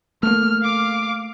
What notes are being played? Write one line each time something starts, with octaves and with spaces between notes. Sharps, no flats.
A3 A#3 F6
F5 D6